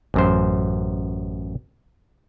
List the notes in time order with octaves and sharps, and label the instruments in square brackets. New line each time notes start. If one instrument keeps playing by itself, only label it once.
[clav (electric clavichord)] A1 F#2 C5